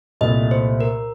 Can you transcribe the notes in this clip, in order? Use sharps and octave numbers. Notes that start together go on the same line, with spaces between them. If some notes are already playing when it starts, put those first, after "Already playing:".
C2 A#2 A3 D#5
C5
A#4